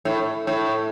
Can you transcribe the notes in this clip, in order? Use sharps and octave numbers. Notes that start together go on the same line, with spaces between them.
A2
A2